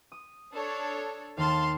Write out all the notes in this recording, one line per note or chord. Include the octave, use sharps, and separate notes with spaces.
D#6
D4 A4 C#5
D#2 F5 A5 C6